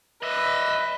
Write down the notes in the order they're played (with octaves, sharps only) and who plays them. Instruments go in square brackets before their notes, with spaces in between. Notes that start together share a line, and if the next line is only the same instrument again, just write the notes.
[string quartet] B4 [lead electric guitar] D#5 E5